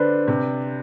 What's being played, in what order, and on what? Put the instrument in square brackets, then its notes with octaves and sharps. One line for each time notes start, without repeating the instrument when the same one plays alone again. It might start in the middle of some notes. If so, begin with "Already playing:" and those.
Already playing: [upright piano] D3 D4 [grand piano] B4 C5
[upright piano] C3